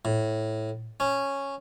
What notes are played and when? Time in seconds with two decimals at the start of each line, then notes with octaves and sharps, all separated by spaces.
0.05 A2
1.00 C#4